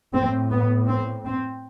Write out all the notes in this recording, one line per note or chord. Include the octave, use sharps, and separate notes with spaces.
A2 C4
B3
C4
C4